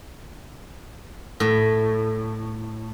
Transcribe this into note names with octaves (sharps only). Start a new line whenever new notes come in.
A2